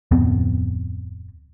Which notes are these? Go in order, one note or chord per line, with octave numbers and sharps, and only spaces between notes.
D1 F2 B3 C4